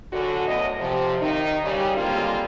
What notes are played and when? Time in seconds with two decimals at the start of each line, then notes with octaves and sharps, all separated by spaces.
0.12 F#2 D3 F#4
0.47 E2 A2 D#5
0.79 C3 F3
1.21 D#3 D#4
1.63 C#3 G3
1.96 D3 G3 G#3 A#3 C4 F4